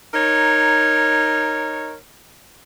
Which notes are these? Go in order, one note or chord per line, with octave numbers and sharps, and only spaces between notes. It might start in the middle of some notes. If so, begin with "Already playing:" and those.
D#4 A#4 C#5